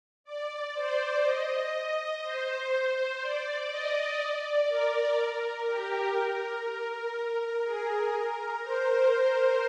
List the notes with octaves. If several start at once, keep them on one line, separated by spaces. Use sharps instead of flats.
D5
C5
D#5
C5
D5
D#5
D5
A#4
A#4
G4
A#4
G#4
A#4
C5